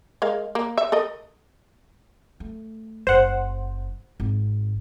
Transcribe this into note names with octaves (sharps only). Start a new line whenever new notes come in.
G#3 A#4 F5
A#3
E5
A4 A#4 D#5
A3
F#1 C5 F#5
G#1